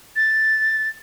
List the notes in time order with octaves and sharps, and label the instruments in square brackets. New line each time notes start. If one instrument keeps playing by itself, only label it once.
[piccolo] A6